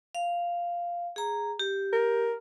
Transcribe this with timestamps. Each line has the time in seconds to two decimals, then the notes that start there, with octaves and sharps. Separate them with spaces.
0.15 F5
1.16 G#4 A#5
1.59 G4
1.93 A#4